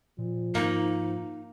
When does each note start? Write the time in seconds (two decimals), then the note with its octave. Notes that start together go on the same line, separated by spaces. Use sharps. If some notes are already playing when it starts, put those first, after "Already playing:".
0.18 A#2 F3
0.55 G#2 A#3 D#4